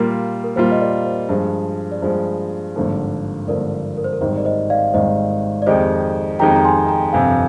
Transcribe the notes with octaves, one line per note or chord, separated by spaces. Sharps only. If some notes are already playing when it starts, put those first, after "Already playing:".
Already playing: A#2 G3 A#3 F4 A#4
A#4
A#2 G3 A#3 F4 C5
D#5
A#4 D5
C5
G2 F3 G#3
D5
G2 F3 G#3 C5
G#1 G2 D3 F3 A#3
G#1 G2 D3 F3 A#3 A#4 D5
A#4
C5
A#4
G#1 G#2 D#3 G3 C5
D5
C5 D#5
D5 F5
G#1 G#2 D#3 G3 C5 D#5
D5
F2 D#3 G#3 D#4 G4 C5 D#5
F2 D#3 G#3 D#4 G4 G5 A#5
A#5
G#5 C6
G5 A#5
G1 F2 C3 F3 F5 G#5